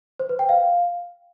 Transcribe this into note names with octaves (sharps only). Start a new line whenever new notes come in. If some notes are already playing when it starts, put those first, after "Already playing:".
C5
B4
G5
F5